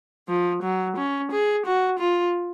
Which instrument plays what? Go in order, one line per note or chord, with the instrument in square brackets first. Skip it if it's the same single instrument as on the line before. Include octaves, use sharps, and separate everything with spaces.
[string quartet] F3
F#3
C#4
G#4
F#4
F4